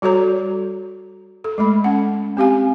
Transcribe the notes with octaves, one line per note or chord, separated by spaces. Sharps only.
G3 F#4 A4 C#5 A#5
A4
G#3 A3 B5
C#4 F#5
C4 G4 F5 G#5